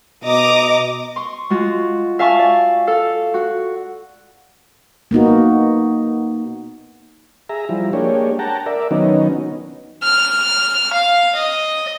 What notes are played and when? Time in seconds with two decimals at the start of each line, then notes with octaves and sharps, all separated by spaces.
0.24 B2 D#5 A#5 D6 D#6
1.16 C6 C#6
1.50 G#3 F4 F#4
2.19 E5 F5 G#5 A5 C#6
2.39 D5 G#5
2.87 A4 F5
3.34 F#4
5.11 A#3 B3 D#4 F#4
7.49 G#4 E5 A#5
7.69 F3 G3 E4
7.93 G#3 A#3 D4 G4 C#5
8.39 F#5 G5 A5 A#5
8.66 A#4 D5 E5
8.91 D#3 F#3 B3 C#4 D#4
10.03 F6
10.93 F5
11.35 D#5